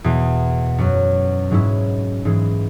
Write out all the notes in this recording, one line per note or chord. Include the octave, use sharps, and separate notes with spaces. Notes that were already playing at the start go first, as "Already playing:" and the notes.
E2 B2 B3
F#2 F#3 C#4 F#4
G#2 F#3 C#4 E4
G#2 E3 G#3